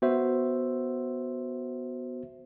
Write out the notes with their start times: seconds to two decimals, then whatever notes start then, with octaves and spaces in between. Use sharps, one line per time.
0.02 B3 F#4 C5 E5